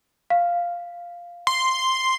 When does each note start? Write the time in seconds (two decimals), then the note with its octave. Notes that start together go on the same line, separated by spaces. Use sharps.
0.30 F5
1.47 C6